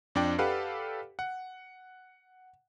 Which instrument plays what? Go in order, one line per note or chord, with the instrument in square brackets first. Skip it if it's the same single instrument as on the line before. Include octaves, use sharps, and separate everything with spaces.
[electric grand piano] F2 D4 D5 G5
G4 A4 B4 D5 F5 F#5
F#5